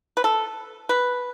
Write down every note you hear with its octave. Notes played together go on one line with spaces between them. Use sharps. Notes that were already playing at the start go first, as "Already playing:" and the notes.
B4
A4
B4